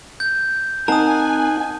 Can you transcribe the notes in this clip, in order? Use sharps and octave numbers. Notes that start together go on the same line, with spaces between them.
G6
C4 D#4 A#4 F#5 G#5 A5 D#6